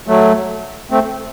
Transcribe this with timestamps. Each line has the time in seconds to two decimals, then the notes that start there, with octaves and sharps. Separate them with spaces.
0.07 F#3 A3
0.91 A3 C4